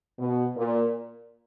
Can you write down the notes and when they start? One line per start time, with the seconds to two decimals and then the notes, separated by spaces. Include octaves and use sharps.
0.19 B2
0.56 A#2